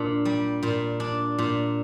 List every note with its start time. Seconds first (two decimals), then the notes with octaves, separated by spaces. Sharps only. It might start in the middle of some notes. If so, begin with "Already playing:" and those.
Already playing: A#2 D4
0.25 G3
0.63 A#2
1.00 D4
1.38 A#2